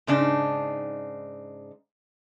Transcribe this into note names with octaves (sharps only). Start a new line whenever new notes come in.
G#2 C#3 D4 D#4